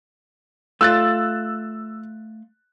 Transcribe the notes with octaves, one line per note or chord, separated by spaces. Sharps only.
A3 F4 E6 F#6 A6